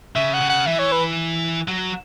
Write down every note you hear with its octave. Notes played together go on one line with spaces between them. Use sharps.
C#3 E5
F#5
C#3
F#5
E3 E5
C#5
B4
F#3